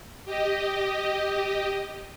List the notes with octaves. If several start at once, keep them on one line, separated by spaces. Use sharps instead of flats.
G4 D#5